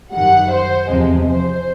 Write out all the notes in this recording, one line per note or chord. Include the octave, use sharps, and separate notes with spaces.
F#2 D#3 G3 F#5
C5
E2 C3 F3 G#3
C5